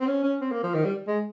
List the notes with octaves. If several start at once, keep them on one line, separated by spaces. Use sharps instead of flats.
C4
C#4
C#4
C4
A#3
F3
D#3
G3
G#3